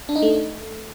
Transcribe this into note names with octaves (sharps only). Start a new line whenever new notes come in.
D4
D#4
A3